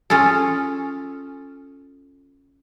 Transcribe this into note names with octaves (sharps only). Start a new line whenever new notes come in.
C#4 F4 G#4 A4